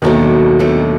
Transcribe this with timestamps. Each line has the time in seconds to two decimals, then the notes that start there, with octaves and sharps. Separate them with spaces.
0.02 D#2 B2 D#3 F#3 A3 D4
0.59 B2 F#3 A3 D4